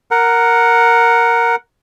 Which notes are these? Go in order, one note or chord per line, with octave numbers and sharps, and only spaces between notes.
A#4 F#5